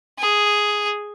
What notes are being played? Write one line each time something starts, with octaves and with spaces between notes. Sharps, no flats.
G#4